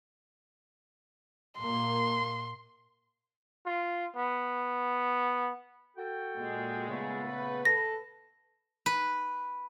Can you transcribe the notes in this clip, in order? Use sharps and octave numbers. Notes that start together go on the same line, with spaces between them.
A#2 A#3 C6
F4
B3
F#4 A4 G5
A#2 G#3
C#3 A3 B3
B4
A4 A#6
B4